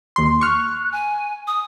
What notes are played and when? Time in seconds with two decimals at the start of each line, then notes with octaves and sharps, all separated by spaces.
0.16 D#2 C6
0.41 C#6 F6 F#6
0.92 G#5
1.47 D#6